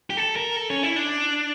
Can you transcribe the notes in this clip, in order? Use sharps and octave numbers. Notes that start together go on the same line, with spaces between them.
G4
A4
A#4
A4
C#4
E4
D4